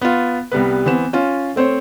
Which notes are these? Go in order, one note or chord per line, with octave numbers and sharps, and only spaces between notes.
B3 F4
C2 G3 B3 B4
E3 B3 C4 E7
C#4 F4
A3 C4 C5 C#5